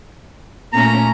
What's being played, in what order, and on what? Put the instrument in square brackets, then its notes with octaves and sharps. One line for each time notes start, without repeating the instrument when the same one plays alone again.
[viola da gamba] A#2 A3 C#4 [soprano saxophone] A#5